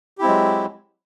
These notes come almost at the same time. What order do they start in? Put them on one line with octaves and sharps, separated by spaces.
G4 E4 C4 G#3 F#3